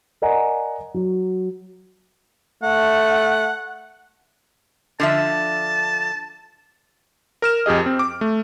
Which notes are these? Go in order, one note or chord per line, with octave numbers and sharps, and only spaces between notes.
A#4 D5 D#5 F#5 G#5 A#5
F#3
A3 F#5
D3 F3 E5 A5
A#4 F6 E7
F2 G4 G#4 D#5
C4
D6
A3